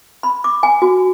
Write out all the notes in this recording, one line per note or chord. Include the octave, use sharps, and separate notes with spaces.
B5
D6
G#5
F#4